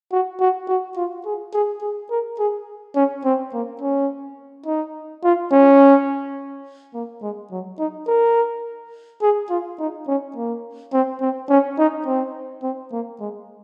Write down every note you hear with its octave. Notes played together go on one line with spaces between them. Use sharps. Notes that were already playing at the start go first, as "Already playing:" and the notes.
F#4
F#4
F#4
F4
G#4
G#4
G#4
A#4
G#4
C#4
C4
A#3
C#4
D#4
F4
C#4
A#3
G#3
F#3
D#4
A#4
G#4
F4
D#4
C#4
A#3
C4
C4
C#4
D#4
C4
C4
A#3
G#3